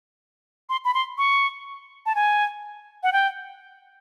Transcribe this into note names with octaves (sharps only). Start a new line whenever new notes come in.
C6
B5
C6
C#6
A5
G#5
F#5
G5